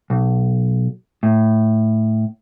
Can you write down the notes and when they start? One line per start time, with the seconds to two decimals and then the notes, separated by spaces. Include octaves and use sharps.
0.10 B1
1.23 A2